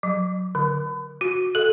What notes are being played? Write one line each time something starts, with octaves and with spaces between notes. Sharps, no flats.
F#3
D3
F#4
A4